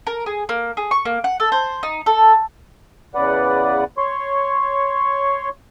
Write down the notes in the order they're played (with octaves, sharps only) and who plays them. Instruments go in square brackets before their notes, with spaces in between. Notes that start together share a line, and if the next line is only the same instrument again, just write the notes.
[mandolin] A#4
G#4
A#3
G#4
C#6
A#3
F#5
A4
C5
D#4
A4
[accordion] E2 C#3 B4 D5 F#5
C#5 C6 C#6